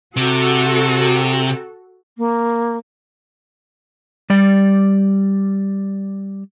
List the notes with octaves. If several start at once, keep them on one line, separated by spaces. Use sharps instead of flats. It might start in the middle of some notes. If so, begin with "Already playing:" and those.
C3 F#4 A4
A#3
G3 D5